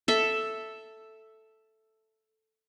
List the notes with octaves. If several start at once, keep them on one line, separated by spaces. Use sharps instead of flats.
A4 E5